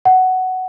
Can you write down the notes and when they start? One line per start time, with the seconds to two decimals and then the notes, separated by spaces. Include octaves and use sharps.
0.05 F#5